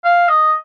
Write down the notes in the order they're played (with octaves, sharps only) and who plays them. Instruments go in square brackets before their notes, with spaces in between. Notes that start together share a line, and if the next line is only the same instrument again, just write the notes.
[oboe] F5
D#5